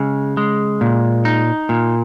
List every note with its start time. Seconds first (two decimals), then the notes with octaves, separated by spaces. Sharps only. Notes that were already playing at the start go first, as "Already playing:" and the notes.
Already playing: C#3 G#3
0.37 G#3
0.81 A#2
1.25 D#4
1.69 A#2